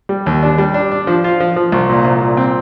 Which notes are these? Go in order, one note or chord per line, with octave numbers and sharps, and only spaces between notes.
G3
D#2
D4
G3
D4
D4
F3
F4
F3
F3
C2
A#2
C2
A#2
C4